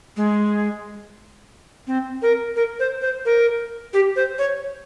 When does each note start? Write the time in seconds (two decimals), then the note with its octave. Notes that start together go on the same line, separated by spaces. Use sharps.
0.17 G#3
1.87 C4
2.22 A#4
2.56 A#4
2.80 C5
3.02 C5
3.25 A#4
3.93 G4
4.16 C5
4.39 C#5